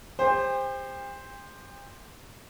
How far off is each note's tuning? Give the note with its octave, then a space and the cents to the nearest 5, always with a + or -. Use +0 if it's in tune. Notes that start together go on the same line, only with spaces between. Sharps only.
G4 +40 C5 +0 G5 +45